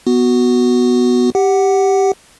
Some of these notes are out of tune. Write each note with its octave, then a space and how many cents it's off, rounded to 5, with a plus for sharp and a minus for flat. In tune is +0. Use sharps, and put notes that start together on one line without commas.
B3 +0 F#4 +0
G4 +0 F#5 +10